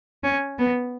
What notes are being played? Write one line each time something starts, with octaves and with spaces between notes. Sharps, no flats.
C#4
B3